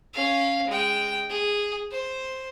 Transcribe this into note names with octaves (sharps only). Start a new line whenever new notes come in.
C#4 F5
G#3 G5
G#4
C5